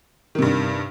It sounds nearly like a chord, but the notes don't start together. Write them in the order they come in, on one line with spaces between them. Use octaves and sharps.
D#3 C3 G2